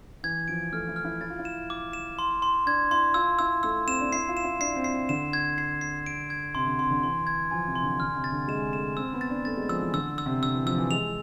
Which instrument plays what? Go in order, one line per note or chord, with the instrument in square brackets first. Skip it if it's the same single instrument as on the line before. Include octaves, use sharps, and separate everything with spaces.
[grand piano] E3 [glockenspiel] G#6
[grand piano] F3 [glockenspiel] D7
[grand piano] A3 [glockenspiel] F6
[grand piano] E4
[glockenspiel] F6
[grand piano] E4
[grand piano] E4 [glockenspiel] A6
[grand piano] F4
E4
[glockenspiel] E7
D6
E7
C6
C6
[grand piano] D4 [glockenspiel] G#6
[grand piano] E4 [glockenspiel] C6
[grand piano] F4 [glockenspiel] E6
[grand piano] E4 [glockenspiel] E6
[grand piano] A3 [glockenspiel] E6
[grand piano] C4 [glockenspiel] E7
[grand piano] D4
[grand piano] E4 [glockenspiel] C7
[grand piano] F4
[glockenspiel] E7
[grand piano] E4
[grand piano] D4 [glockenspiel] C7
[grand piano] C4
[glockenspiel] C7
[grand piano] C4
[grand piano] D3 [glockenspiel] E7
[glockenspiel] G#6
C7
C7
D7
G#6
[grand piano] C3 [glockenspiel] C6
[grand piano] D3
[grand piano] C3 [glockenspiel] C6
[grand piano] D3
[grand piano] E3 [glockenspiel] C6
[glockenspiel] G#6
[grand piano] F3 [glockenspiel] G#5
[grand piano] C3
[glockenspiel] C6
[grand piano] D3
[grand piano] D3 [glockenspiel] F6
[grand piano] C3
[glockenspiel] A6
[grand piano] D3
[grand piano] G#3 [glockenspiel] E7
[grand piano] A3 [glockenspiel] E7
[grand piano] C4 [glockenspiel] E6
[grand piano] B3
[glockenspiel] A6
[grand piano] D4
[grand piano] A3 [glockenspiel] A6
[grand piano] G#3
[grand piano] F3 [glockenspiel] E6
[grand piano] E3
[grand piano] D3 [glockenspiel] E6
[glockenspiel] E6
[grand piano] C3
[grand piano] D3 [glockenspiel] E6
[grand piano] E3
[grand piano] F3 [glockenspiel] E6
[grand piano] E3
[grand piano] G#3 [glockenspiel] F7